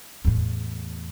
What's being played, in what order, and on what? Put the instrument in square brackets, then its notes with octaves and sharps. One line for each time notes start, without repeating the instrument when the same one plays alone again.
[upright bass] E2 A2